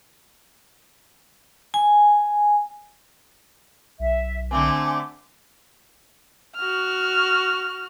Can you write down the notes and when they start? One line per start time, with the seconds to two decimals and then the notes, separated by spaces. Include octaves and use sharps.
1.74 G#5
3.99 B1 E5
4.51 D3 A3 C4 G#5 D6
6.56 F#4 F6